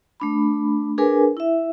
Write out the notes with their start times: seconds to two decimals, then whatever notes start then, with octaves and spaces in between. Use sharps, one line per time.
0.20 A3 D4 B5
0.98 D4 G#4 A#4 B4 G#5
1.37 E4 E5